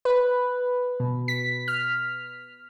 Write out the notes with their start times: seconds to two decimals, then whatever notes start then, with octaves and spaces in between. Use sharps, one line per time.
0.05 B4
1.00 B2
1.28 B6
1.68 F6